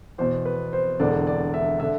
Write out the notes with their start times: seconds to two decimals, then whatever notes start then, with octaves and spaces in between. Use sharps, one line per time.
0.18 E2 B2 C5
0.45 B4
0.73 C5
1.00 E1 E2 D3 D5
1.27 D5
1.54 E5
1.80 D3 E5